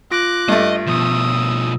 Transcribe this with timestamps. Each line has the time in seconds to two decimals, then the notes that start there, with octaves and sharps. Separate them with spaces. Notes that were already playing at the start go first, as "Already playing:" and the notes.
0.11 F4 D6 F#6 A#6 D7
0.49 G2 A3 D#5
0.87 B2 F3 D#6 E6